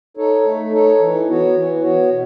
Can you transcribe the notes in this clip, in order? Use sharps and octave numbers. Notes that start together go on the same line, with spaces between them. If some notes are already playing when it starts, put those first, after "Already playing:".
D#4 A4 C#5
A3
D#4 A4 C#5
E3
B3 F#4 C#5
E3
B3 F#4 C#5
B2